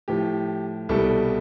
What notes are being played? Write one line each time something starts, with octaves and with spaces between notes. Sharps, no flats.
A2 F3 G4
C2 B2 G3 A4